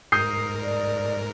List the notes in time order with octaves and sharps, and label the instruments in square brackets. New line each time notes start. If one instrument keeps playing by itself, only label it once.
[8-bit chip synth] G#2 A#4 [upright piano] D#6 G6 C7
[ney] D5